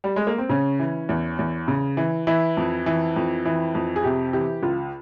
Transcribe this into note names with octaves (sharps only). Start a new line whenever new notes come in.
G3
G#3
A#3
C4
C#3 C#4
E3
E2
E2
C#3
E3
E3 E4
F2
E3
F2
E3
F2
G#4
C3 G4
E3 G4
C#2 F4